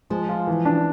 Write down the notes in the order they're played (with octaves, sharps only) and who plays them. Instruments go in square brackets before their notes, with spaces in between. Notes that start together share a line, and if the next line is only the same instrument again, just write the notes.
[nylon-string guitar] F3 [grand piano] G#3
[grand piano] F4
E3
D4